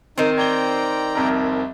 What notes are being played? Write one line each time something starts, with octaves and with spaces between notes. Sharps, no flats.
D#3 C4 D#4
D5 G5 A#5 G#6 G7
C2 F2 A#4